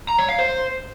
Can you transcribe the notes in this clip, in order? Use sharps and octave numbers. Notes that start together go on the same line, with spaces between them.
A#5
C#5
F5
C5